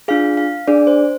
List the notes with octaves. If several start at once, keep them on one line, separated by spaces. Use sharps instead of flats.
D4 F4 G#4 F5
F5
D4 G#4 D5
C5